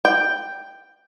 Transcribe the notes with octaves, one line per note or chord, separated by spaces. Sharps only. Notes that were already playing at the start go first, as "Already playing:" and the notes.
G5